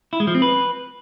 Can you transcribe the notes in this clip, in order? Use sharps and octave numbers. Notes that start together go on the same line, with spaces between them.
E4
G#3
F3
C4
B4